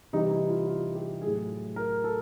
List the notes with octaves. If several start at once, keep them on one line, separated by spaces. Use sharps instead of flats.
C3 E3 G3 D#4
E4
F4
F4
G4
A2 F#3 G#4
A#4
A4